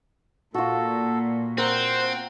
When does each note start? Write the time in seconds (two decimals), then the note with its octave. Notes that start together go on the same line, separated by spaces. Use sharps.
0.54 A#2 F4 F#4 A4
1.58 C4 A#4 C5 F#5